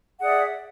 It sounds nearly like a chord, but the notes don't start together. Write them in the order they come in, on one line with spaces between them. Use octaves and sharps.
F#5 G#4 D5 E5